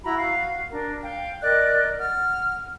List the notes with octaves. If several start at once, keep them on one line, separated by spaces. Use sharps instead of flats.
E4 F#4 A#5 B5
F#4 F5
D4 A#4
F5 G5
A#4 D5 D#5 F#6
F#5 F6